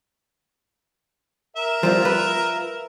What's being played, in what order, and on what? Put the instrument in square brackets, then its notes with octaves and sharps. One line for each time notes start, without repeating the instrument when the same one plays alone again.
[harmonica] A#4 E5
[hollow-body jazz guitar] F3 G3 F4
F4 B4